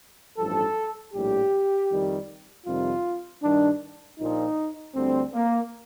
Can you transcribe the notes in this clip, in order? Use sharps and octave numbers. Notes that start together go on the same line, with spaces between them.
A1 G2 F3 A4
A#1 A2 G3 G4
F2 D#3 G3
F2 C3 D#3 G3 F4
G2 D#3 G3 D4
A#1 A#2 F3 D#4
D2 D3 G3 C4
A#3